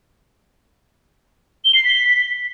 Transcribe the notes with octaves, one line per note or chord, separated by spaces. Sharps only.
G7
C7
B6